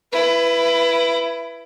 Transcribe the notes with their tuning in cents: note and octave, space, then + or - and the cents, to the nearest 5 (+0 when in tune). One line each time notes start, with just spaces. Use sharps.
E4 +20 B4 +0